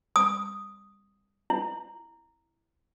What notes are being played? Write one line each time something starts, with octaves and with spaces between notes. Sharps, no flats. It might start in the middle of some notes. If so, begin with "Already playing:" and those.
D#6
E4